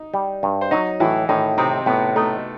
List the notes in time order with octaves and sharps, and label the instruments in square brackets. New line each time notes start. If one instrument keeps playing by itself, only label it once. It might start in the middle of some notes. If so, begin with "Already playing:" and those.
Already playing: [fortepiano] D#4
[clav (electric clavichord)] G3
G2
[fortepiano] C5
[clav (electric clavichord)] F#3 [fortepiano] D#4 D#5
[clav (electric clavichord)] A2 [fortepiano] E3 E4
[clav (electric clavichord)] A2 [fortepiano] D#3 D#4
[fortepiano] C3 C4 [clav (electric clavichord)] D#4
[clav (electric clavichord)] A2 [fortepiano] B3
[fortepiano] A3 [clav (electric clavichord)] D#4